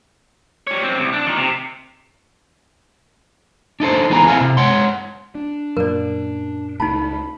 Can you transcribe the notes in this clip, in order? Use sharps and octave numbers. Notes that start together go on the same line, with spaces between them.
G3 C#5
F#2 C4
C2
D4
A#2 D#3
C3
D4 D#4 A4 C5
C#2 E3 B3 G#4 B4 A#5
C4 E4 A4 F5 F#5 G#5
C3
G#3 C#5 F#5 C6
D4
F#2 A#2 A#4 D5
C#2 A3 D#4 A5 B5